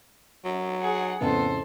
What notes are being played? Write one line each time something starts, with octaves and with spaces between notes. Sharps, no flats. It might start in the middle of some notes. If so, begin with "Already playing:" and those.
F#3
G#4 F#5
F2 A2 C#3 B3 A4 C5